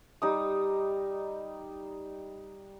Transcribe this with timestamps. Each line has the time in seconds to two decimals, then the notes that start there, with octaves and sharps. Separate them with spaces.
0.22 G3 D#4 D#6